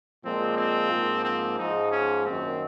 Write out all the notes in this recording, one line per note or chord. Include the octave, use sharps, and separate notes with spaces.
A#2 F3 G#3 C4
C4
G#2 F3 A#3
C4
G#2 F3 G#3 D#4
C#4
F#2 D#3 A#3 C4